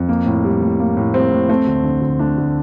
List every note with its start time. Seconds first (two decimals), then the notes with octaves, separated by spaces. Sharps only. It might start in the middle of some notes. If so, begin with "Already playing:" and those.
Already playing: F2
0.09 A#3
0.26 A2
0.44 G3
0.62 A2
0.79 A#3
0.97 A2
1.14 G3 C4
1.32 A2
1.49 A3 C4
1.67 D2
1.84 D3
2.01 D2
2.19 A3 D4
2.38 D2